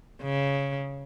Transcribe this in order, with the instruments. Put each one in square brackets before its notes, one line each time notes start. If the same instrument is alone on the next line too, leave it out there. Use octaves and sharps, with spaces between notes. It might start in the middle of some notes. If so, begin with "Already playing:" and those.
[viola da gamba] C#3